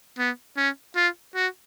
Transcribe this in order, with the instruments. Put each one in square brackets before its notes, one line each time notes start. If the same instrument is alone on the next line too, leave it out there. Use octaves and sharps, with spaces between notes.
[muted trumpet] B3
C#4
F4
F#4